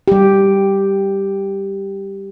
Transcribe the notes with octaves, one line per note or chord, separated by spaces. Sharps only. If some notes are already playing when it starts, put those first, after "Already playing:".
G3 G4